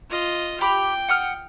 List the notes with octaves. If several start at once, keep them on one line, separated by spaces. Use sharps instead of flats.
F4 D#5
G4 G5 B5 D6
F#5 D#6 F6